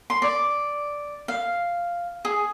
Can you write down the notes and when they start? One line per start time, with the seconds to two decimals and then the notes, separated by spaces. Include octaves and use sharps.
0.10 C6
0.22 D5
1.28 F5
2.25 G#4